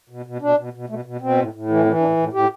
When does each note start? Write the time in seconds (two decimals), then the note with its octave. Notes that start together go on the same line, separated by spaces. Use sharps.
0.09 B2
0.26 B2
0.41 B2 D4
0.57 B2
0.73 B2
0.89 B2 A3
1.05 B2
1.21 B2 C4
1.37 A2
1.53 A2
1.69 E3
1.85 E3 C4
2.01 A2 D4
2.17 A2
2.33 A2 G4